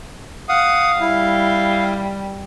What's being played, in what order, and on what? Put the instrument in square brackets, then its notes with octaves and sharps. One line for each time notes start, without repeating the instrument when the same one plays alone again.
[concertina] F5 [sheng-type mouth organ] F#5 D#6
[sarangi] G3 [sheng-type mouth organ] E4